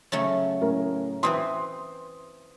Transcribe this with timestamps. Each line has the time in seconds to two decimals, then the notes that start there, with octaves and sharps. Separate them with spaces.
0.12 C#3 F#3 A3
0.62 A2 C#4 A#4
1.23 E3 C4 B4 C6 D#6